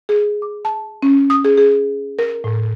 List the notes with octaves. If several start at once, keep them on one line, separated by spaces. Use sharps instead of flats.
G#4
D6
A5
C#4
D#6
G#4
G#4
A#4
A2